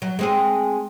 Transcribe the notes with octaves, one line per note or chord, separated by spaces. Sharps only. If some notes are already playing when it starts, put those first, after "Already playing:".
F#3
G#3 C4 G#4